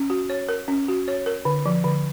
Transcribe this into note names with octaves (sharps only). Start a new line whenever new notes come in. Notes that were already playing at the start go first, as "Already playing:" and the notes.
Already playing: C#4
F#4
C#5
A#4
C#4
F#4
C#5
A#4
D3
F3
D3